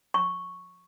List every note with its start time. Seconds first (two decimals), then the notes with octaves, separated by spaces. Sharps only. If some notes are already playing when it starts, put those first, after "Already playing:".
0.14 C#6